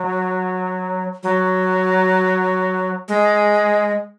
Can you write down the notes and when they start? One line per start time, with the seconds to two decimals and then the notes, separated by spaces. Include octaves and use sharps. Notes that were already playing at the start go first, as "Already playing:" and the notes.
Already playing: F#3
1.23 F#3
3.08 G#3